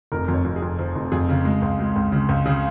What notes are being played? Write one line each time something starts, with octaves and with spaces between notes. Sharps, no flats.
F1 A#4
F2
C#5
F2
G#4
F2
F3
F1
F2 G#4
C#3
G#3
C#2
G#3
C#2
C#3
C#2
C#3 G#4